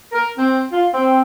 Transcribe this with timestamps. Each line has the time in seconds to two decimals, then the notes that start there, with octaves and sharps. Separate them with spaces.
0.13 A#4
0.37 C4
0.72 F4
0.93 C4